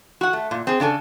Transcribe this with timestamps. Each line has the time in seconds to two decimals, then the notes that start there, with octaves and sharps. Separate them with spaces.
0.21 F#4 F#5
0.33 A3
0.51 A#2
0.67 C4 G#4
0.80 C#3 D4 A4 G#5